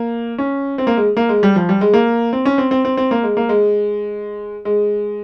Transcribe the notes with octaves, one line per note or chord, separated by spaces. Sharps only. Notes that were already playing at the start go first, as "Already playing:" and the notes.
Already playing: A#3
C#4
C4
A#3
G#3
A#3
G#3
G3
F3
G3
G#3
A#3
C4
C#4
C4
C4
C4
C4
A#3
G#3
A#3
G#3
G#3